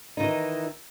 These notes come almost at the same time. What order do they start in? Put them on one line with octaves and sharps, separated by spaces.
D#4 D#3 E3